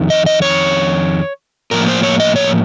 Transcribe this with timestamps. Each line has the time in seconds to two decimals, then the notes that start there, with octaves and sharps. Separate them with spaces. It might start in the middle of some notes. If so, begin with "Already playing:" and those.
Already playing: F2 D#3
0.10 D#5
0.26 D#5
0.42 C#5
1.71 A2 F3 A#3 A#4
1.88 C5
2.03 C#5
2.20 D#5
2.36 C#5